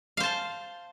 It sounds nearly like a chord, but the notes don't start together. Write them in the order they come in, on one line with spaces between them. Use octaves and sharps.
F5 C5 A5